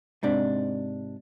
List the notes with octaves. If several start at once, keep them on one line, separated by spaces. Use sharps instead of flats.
G#2 C3 D4